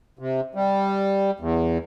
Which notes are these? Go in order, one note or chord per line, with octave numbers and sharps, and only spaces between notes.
C3
G3
E2